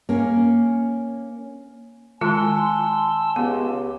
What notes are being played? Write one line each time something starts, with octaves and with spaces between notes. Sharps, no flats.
A#3 C#4
D#3 G#3 F4 G#5 A5 C6 E6
C#2 B3 G4